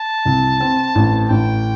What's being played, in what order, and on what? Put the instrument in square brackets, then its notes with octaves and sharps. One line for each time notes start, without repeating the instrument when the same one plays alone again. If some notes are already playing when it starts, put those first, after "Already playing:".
Already playing: [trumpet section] A5
[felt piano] C2
C4
A1
[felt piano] A1 [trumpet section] G5